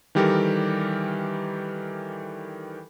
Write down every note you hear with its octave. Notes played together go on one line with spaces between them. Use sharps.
D#3 E3 G3 G4 A4 A#4